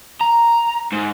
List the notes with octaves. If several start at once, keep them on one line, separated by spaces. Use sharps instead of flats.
A#5
G#2